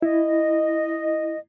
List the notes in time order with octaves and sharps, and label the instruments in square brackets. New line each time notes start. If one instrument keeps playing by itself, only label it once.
[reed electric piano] E4 [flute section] D#5